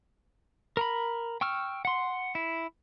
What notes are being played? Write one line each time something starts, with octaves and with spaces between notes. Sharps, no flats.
A#4 A#5 B5
G5 C#6 E6 F6
F#5 C6
E4